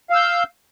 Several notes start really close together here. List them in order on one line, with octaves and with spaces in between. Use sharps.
F5 E6 G6